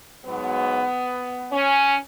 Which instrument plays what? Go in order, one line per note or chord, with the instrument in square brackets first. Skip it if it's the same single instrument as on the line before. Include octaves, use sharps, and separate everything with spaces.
[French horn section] G#2 F#3 B3
C#4